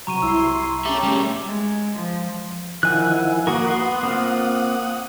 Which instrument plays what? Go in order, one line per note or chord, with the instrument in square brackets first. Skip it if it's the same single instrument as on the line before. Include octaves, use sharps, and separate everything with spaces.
[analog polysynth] C3 F#3 [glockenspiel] A#5 C#6 D#7
[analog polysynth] C2 E4 C6 [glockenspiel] E6
[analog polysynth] C#4 G4 [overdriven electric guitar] A4 E5 [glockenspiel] A#5 D6
[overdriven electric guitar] G3 A3
[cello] G#3
F3
[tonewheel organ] D#3 F3 E4 [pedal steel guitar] F#5 G#5 F#6
[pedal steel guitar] A#3 F#4 A#4 [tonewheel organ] F#5 D#6
[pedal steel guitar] B3 C6
A#3 C4 F4